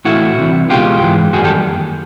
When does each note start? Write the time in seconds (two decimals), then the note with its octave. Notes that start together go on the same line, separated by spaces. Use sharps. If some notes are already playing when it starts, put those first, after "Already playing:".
0.05 A2 E3 A3 E4 F#4
0.37 C2 C3 E3
0.70 C#2 B2 G#3 F4 G4
1.01 G#2 E3 G#3
1.33 F#2 D#3 G3 A#3 F#4 G#4
1.44 G4 A4